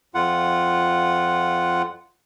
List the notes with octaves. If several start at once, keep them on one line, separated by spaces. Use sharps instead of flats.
F2 F4 F#5